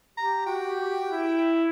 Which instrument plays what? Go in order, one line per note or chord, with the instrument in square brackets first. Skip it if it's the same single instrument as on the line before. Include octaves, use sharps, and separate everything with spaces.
[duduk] G4 [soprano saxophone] A#5
[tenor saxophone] F#4 [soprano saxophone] G5
[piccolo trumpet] E4